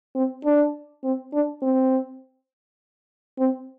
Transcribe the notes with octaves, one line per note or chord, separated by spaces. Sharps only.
C4
D4
C4
D4
C4
C4